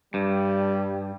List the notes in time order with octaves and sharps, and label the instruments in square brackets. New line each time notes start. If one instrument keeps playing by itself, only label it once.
[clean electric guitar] G2 [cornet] G3